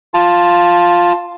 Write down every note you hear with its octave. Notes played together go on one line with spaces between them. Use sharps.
F4 A5